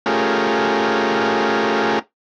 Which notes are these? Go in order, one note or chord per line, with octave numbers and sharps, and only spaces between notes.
A3 C#4 F4 G4 G#4 A#4